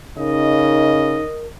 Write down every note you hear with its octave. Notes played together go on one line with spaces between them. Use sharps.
C#3 D#4 A#4 D#5